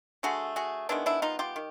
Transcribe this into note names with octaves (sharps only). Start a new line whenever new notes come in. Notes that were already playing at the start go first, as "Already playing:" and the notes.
D3 F#3 A3 F#4 G#4
F#4 G#4
D#3 G#3 B3 D4 E4
D4 E4
D#4 F4
F4 G4
D#3